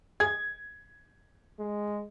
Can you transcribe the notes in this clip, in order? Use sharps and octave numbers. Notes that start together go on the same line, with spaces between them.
G#4 G#6
G#3